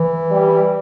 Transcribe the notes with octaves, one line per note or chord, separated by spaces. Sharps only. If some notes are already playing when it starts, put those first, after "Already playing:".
Already playing: E3
G3